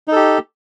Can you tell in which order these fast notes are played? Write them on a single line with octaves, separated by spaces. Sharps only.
D#4 A4 G4